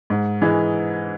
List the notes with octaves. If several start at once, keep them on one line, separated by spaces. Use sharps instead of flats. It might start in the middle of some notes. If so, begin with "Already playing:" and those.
G#2
E3 G#3